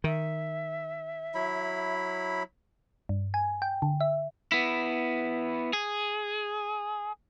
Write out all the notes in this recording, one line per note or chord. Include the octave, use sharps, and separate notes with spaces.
D#3 E5
F#3 E4 B5
G2
G#5
G5
D3
E5
B3 E4
G#4